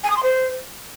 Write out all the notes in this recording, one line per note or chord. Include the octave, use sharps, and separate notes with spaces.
G#5
D#6
C6
C5